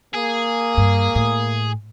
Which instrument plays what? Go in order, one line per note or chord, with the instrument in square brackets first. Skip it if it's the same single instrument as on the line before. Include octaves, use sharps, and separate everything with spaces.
[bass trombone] A#3 [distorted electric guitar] G#4
[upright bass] G2
A2